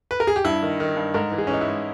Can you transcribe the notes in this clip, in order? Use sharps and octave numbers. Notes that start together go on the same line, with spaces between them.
B4
A#4
G#4
G4
G2 E4
D#3
D#3
G2
G#2 A#4
E3
G#4
C#4
E3 D#4
E4
G#2